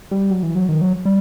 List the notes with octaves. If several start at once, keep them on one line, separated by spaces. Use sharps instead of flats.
G3
F#3
E3
F#3
D#3
F#3
G3